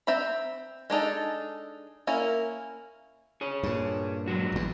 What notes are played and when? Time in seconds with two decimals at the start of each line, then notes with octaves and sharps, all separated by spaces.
0.07 C4 E5 A#5 B5
0.90 G#3 D4 D#4 A4
2.07 A#3 C#4 E4 A#4
3.41 G#4 C#5
3.63 G2 A#2
4.28 F#3 G#3 F#4
4.52 A1 E2